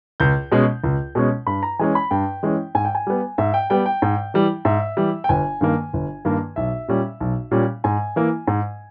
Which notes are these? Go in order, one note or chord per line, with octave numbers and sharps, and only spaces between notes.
C#2 G6
B2 G#3 C#4
C#2
B2 G#3 C#4
G2 B5
A#5
E3 G#3 C#4 G#5
B5
G2 G5
E3 G#3 C#4
G#2 G#5
G5
G#5
G3 B3
G#2 E5
G5
G3 B3 G5
G5
G#2
E3 G3
G#2 E5
E3 G3
G5
G1 G#5
G2 D#3 A#3
G1
G2 D#3 A#3
B1 E5
A#2 G3 C#4
B1
A#2 G3 C#4
G#2 G#5
E3 A#3
G#2